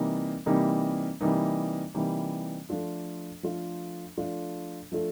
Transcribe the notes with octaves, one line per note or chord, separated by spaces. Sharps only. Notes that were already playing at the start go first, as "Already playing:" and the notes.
Already playing: C3 E3 G3 A#3 D#4
C3 E3 G3 A#3 D#4
C3 E3 G3 A#3 D#4
C3 E3 G3 A#3 D#4
F3 A3 D4 F4 A4
F3 A3 D4 F4 A4
F3 A3 D4 F4 A4
F3 A3 D4 F4 A4